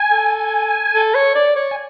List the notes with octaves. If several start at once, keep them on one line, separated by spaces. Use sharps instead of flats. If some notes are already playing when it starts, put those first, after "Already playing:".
Already playing: G#5
A4
A4
C#5
D5
C#5
G#5